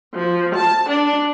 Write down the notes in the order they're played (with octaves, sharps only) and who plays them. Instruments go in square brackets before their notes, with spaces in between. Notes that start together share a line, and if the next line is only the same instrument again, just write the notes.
[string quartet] F3
A5
D4